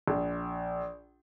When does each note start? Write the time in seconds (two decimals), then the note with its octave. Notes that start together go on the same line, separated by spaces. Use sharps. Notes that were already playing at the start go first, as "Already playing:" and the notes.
0.08 A#1